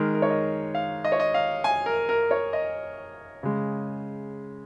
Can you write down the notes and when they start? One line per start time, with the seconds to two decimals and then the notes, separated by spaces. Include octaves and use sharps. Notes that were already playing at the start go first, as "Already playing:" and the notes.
Already playing: D#3 G#3 A#4
0.15 A#4
0.22 C#5
0.30 D#5
0.75 F5
1.05 D#5
1.12 C#5
1.20 D#5
1.34 F5
1.64 G#5
1.86 A#4
2.09 A#4
2.31 C#5
2.53 D#5
3.43 C#3 G#3